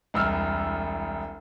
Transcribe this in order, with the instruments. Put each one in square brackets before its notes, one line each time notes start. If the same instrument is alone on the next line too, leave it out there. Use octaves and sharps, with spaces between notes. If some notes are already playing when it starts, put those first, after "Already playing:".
[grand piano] E1 C2 E6 F6